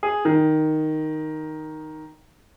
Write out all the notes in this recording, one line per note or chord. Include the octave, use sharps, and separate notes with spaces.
G#4
D#3